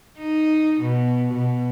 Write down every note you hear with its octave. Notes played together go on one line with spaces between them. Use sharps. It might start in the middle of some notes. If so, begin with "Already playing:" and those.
D#4
B2
B2